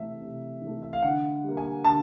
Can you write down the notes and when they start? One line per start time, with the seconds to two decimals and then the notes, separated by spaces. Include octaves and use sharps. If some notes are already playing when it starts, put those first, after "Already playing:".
Already playing: C3 E3 A3 E5
0.21 C3
0.62 E3
0.67 A3
0.82 E5
0.93 F5
1.02 D3 F#5
1.43 G3
1.49 A#3
1.57 G#5
1.84 D3 A5